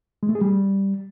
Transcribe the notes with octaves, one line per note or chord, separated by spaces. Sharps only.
G#3
A3
G#4
G3